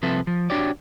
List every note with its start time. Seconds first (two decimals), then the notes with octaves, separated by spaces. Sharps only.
0.02 C2 F3 C4 A4 B4 E5
0.27 F3
0.50 D4 F#4 G4 C#5 D5